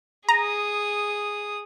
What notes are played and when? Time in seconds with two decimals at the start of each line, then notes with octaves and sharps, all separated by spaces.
0.29 G#4 A#5 D#6